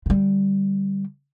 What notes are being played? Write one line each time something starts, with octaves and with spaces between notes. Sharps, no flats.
D3 G3